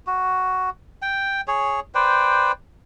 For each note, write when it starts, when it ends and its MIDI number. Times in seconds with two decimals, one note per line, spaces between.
0.07 0.70 66
1.02 1.41 79
1.48 1.80 68
1.48 1.80 73
1.95 2.52 71
1.95 2.52 72
1.95 2.52 74
1.95 2.52 79